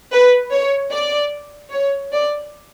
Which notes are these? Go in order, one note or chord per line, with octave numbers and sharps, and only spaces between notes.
B4
C#5
D5
C#5
D5